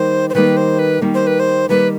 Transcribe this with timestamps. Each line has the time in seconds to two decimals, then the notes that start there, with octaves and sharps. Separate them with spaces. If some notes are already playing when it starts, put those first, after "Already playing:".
Already playing: D#3 G3 A#3 C5
0.30 C5
0.34 D#3 G3 A#3 B4
0.57 C5
0.79 B4
1.01 D#3 G3 A#3
1.14 C5
1.27 B4
1.40 C5
1.69 D#3 G3 A#3 B4